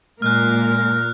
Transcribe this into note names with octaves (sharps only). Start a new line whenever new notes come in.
A#2 G#3 A#3 A#4 F6 F#6